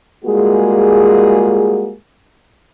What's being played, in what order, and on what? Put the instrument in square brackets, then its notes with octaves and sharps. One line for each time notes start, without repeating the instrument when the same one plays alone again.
[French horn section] G3 G#3 A#3 F4 F#4 G#4